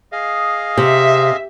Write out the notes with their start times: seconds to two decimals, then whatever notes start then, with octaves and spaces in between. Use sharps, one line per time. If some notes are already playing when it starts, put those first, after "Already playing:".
0.12 G#4 D#5 F5
0.78 C3 E5